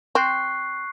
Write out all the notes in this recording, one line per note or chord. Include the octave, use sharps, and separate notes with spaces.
C4 C#6 F#6 C7